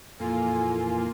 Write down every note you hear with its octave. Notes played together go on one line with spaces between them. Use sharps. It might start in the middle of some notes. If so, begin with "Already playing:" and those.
F2 A#2 E3 A#3 F4 A4 G#5